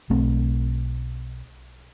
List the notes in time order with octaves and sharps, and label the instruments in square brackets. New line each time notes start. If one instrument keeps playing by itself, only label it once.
[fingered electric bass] B1 A3 C4